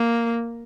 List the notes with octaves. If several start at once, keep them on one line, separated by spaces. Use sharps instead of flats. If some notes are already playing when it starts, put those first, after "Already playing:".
Already playing: A#3